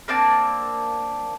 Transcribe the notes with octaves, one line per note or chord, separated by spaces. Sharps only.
A#3 C4 D4 A5